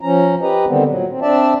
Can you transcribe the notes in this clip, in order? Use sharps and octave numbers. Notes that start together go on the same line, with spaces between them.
F3 C#4 A#5
G4 B4 D#5 A#5
D3 D#3 G3 B3 C4
A#2 F#3
C4
C4 D4 D5 E5 A5